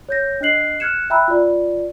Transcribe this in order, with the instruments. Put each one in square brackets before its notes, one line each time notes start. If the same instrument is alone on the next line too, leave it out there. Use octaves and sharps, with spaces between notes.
[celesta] C#5 G6 A#6
D4 D#5 F#6 C7 F#7
F6 F#6 G#6 C#7 E7
E5 G5 A#5 B5 E6 F#6
F4 D5